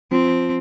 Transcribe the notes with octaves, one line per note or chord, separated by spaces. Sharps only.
F3 C4